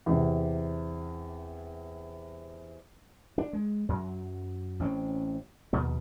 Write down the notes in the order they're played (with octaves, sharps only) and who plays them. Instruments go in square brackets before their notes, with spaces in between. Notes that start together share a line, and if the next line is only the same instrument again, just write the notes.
[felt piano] E2 C3
[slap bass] D4
G#3
F#2 F#3
A1 C4 C#4
A#1 D#2 B2 B3